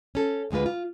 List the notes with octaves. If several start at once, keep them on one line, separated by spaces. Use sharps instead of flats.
C#4 A4
D2 D3 G#3 F4 B4
F4